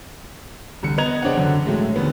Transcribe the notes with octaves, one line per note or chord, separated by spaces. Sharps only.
C2 D3 C#7
B3 D#5 A#5 G#6 F7
C#3 C4 D4 C#5 F#5
F#2 D3
A2 F#3 G#3 A3
D#2 D3 D#3 B3